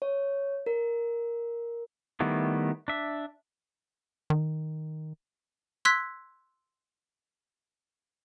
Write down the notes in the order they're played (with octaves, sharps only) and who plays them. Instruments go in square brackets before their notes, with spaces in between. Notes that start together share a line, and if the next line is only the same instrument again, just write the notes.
[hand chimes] C#5
A#4
[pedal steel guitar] D#3 G3 A3 B3 E4
D4 E5
[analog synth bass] D#3
[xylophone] C6 E6 F#6 G#6 B6